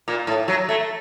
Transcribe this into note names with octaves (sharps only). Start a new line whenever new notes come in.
A#2
A2
F#3
A3